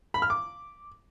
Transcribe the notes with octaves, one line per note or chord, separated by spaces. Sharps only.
B5
F6
D6